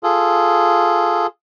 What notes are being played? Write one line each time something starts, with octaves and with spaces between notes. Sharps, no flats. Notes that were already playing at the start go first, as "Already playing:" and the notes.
F4 G#4 A4